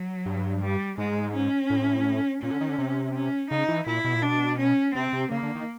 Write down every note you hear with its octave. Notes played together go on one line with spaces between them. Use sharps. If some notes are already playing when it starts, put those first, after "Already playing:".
Already playing: F#3
G2
G3
G#2 G#3
C#4
A2
A#2 C#4
D3
D#3
D3
C3
C#4
C#3 D#4
E3
A#2 E4
B2
A#2
B2 D4
C#4
C3 C4
C3
C#3 A#3
D3
D#3